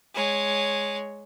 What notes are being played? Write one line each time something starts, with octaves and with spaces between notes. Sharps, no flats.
G#3 C#5